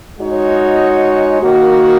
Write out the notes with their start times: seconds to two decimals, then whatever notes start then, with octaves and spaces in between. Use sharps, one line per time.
0.19 G#3 D#4 F#4 C#5
1.41 D#3 A#3 F#4